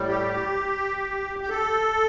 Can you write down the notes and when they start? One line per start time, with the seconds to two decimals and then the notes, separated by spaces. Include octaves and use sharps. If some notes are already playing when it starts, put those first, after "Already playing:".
Already playing: A2 G3
0.08 G4
1.41 G4
1.50 A4